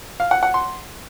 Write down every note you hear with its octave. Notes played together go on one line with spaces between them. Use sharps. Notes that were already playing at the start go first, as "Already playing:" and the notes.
F5
F#5
F#5
C6